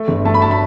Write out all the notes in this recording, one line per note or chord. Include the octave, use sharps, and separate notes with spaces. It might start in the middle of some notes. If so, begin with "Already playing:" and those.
Already playing: A3
G1
A3 A5
B5
A5
B5